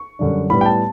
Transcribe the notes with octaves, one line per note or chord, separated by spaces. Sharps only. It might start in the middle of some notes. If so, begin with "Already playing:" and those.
Already playing: C#6
F#2 D3 G3 D4
A2 G3 B3 B5
G5
A5